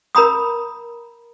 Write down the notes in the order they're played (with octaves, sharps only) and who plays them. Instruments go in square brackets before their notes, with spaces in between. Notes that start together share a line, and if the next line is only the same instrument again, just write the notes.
[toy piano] A#4 A#5 B5 D#6